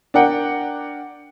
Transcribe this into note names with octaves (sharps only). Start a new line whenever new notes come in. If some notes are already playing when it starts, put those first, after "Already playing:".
D4 A#4 F#5 G5